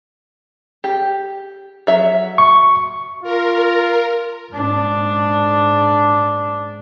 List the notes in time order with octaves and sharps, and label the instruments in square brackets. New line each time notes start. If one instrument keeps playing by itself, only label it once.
[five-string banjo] G4
F#3 E5
[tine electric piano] C#6
[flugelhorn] F4 [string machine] A#4
[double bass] G#2 D4